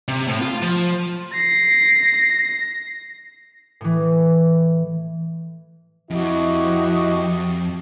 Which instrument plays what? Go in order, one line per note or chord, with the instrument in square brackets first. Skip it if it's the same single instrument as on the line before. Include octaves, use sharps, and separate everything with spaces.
[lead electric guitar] C3
A2
F4
F3
[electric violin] A#6 C7
[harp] A2 E3
[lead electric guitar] F2 [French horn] E4 [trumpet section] F#4 G4 D#5